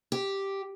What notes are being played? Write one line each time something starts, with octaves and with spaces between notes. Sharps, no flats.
G4